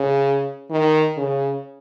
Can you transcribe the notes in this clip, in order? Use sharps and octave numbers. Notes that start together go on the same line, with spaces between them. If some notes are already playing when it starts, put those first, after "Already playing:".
Already playing: C#3
D#3
C#3